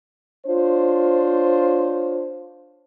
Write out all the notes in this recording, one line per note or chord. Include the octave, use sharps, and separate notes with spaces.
D4 F4 C5 C#5